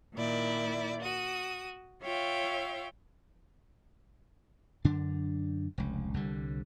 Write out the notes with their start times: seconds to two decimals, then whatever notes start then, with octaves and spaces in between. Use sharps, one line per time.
0.14 A#2 D#3 E4 D5
1.00 F#4 D#6
2.03 F4 C#5 E5 F5 G5
4.84 F#2 D3 D4
5.78 F1 C#2
6.14 C2 D3 G3